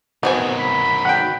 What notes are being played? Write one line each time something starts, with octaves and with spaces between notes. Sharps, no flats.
D#3 F#3 B3 C4 G#5
B5
F#5 G5